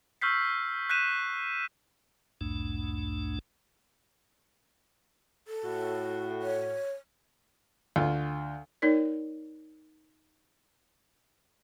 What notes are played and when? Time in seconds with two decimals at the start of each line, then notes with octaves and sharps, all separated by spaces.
0.21 C#6 E6 F6 G6 B6 C7
0.90 F#6 G6 B6 D#7 E7
2.41 B1 E2 G#2 A3 D4
5.47 A4
5.64 A2 F#4
6.42 C#5
7.96 D2 F4
8.82 A#3 D#4 A#4 C#5 D5